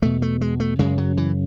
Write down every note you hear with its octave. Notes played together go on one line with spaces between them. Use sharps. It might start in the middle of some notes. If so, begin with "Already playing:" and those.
E2 B2 A3
A3
G#3
A3
F#2 C#3 G#3
F#3
E3